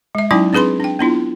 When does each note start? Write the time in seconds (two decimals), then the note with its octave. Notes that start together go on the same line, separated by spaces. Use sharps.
0.15 G#3 E5
0.31 F#3 C#4 D#4 E4 G5 D6
0.53 C4 D4 G#4 B4 B5 C6
0.80 D4 G5
0.99 B3 D4 E4 F4